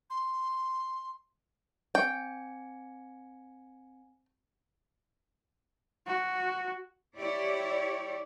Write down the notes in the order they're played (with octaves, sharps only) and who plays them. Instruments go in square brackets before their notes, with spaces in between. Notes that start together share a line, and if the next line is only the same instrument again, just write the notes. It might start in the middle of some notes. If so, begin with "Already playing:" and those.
[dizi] C6
[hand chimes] C4 G#5 C#7 [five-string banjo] G5
[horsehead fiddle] F#4
[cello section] E4 G4 C#5 D5